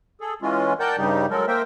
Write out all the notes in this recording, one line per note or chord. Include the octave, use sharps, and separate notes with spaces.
G#4 A4
E3 G#3 C#4 F4
A#4 D5 F#5 G5 A5 G6
G2 C#3 G3 D#4 G4
F#3 G#3 A4 A#4
A#3 A#4 C5 E5 G5